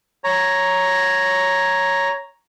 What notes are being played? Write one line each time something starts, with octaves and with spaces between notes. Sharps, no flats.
C#5 A#5